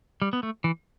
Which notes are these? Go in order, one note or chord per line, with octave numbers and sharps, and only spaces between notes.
G3
B3
A3
E3